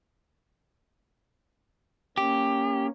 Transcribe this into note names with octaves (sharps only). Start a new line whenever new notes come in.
A#3 C#4 G4